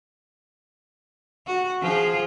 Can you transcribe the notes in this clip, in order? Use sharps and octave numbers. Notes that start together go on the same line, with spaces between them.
F#4
F3 F4 G#4